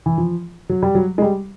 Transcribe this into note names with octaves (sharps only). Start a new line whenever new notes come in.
E3
F3
F#3
G3
F#3
G#3
G3